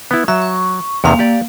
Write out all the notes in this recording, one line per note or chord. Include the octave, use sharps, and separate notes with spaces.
B3 E4
F#3 E5
C#6
E2 C3 D#3 A#3 F5
G4 D5